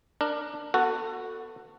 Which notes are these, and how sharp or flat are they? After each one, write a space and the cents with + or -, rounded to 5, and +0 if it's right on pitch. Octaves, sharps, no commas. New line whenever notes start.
D4 +15 A#4 +0
B3 +5 F#4 +0 A4 +25